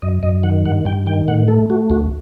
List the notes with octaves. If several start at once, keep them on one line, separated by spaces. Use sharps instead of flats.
F#2 D#5
F#2 D#5
D#3 F#5
G2 F#5
G2 G5
D#3 G5
A2 F#5
A3 A4
A3 F#4
D2 F#4